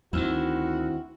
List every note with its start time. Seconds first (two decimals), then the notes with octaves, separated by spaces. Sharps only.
0.13 D2 D#3 C4 E4 F#4